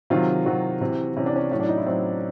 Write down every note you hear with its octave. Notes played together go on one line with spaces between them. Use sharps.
C3 D#3 F#3 F4
C3 D#3 F#3 F#4
C3 E3
C3 E3 C#4
D4
C#4
A2 F#3 C#4
D4
D#4
E4
A2 F#3 C4